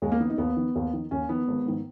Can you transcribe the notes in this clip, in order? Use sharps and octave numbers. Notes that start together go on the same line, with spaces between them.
D#2 G#3
A#3
D#3 B3
D#4
D#2 B3
D#3
D#2
D#3
D#2 C#4
D#3 B3
G#1
G#2 D#3